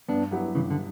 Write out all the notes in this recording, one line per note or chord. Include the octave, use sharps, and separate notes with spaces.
G2 B3 D4
F#3 B3 E4 G4
G2 C#3 E3
D3